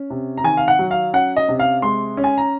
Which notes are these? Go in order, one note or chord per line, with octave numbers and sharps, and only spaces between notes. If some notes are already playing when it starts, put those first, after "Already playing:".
Already playing: C#4
C3
A#5
D#3 G#5
F5
F#5
F#3
F5
C#4 F#5
D#5
C3
F5
G#3 C6
C#4
G#5
A#5